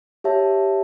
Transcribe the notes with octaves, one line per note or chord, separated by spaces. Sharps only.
G4 C#5 E5 A5